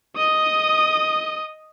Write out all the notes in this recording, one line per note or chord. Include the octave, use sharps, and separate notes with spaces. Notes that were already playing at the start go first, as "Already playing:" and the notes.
D#5 D#6